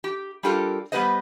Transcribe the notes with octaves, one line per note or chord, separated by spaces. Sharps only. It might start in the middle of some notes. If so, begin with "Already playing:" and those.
G4
G3 D4 F4 G4 A4 A#4
G3 B3 G4 B4 C5 D#5